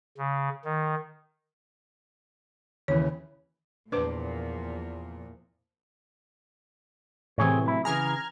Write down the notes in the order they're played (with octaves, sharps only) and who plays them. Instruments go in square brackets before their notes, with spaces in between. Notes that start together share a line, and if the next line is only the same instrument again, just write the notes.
[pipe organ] C#3
D#3
[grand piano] D#2 C#3 E3 [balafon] C#5
[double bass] E2 F3 [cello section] A#2 [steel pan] D4 C5 D6 [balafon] B4
[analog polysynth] A2 C3 E3 [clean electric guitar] C4 G#4 C#5
[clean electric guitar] F#3 E4
[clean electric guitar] C#3 E3 G#4 [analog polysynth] A#5 F6 G#6